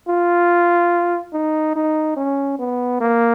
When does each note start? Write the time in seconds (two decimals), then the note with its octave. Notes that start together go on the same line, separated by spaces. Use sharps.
0.08 F4
1.33 D#4
1.76 D#4
2.17 C#4
2.59 B3
3.01 A#3